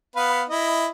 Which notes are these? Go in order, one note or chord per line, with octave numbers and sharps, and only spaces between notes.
B3 B4 F5
E4 D#5